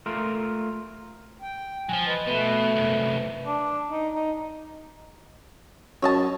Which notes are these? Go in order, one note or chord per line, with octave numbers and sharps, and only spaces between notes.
A3 F4 A#4
G5
F3 F#3 G#5
B4 D#5
B2 A3 B4
C2 F#2
D4
D#4
D#4
F#2 C#5 D#5 A5